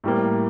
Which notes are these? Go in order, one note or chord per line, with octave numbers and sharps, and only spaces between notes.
A2 G3 A#3